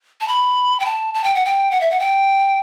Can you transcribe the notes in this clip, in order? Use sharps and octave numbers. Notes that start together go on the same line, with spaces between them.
A5
B5
G5
A5
A5
G5
F#5
G5
F#5
E5
F#5
G5